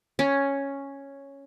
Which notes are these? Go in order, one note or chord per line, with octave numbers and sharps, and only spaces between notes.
C#4